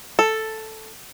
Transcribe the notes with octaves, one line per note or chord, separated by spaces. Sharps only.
A4